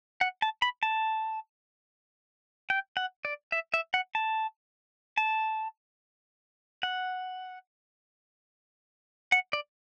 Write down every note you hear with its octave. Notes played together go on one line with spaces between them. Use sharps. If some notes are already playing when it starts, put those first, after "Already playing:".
F#5
A5
B5
A5
G5
F#5
D5
E5
E5
F#5
A5
A5
F#5
F#5
D5